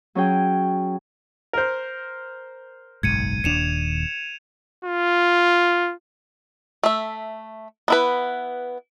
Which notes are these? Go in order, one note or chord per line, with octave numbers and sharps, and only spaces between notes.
F#3 C#4 G#4 G5
A#4 C5
F#1 B1 G#2 G#6 C#7 D#7
D#1 D#2 D4 C#7 E7 F7
F4
A3 E5
B3 E4 B4